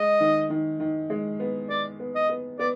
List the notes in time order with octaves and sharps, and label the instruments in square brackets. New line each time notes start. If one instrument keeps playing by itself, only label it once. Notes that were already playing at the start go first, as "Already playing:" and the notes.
Already playing: [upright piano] G#3 [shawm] D#5
[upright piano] D#3
D#3
D#3
G#3
B3
[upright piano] B3 [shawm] D5
[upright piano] B3
[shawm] D#5
[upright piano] B3
[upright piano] B3 [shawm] D5